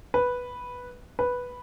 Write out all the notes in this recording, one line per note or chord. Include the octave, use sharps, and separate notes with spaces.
B4
B4